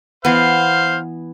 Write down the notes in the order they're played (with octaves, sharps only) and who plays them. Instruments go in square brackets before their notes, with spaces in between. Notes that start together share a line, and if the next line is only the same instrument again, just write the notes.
[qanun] E3 B3 [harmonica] C5 F5